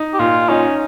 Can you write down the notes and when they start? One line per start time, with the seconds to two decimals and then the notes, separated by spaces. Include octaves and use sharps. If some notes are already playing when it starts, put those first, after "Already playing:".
Already playing: D#4
0.13 G4
0.19 A#2 F4
0.49 C#4 D#4